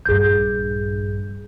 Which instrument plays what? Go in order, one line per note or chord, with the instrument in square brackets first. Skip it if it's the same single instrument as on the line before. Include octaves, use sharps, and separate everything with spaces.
[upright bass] A#1 G2 [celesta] G#4 G6